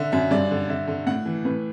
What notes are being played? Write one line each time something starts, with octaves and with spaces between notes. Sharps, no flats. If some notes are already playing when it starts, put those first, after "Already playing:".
Already playing: D3 E5
F#2 E5
G2 D5
D3
D3 E5
D3
A2 F#5
E3
A2 B4